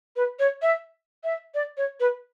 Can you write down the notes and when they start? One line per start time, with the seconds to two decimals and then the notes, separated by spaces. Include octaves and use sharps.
0.16 B4
0.39 C#5
0.62 E5
1.24 E5
1.55 D5
1.77 C#5
2.00 B4